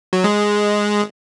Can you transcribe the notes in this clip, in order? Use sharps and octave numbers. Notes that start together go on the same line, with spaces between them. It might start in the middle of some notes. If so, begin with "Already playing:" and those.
F#3
G#3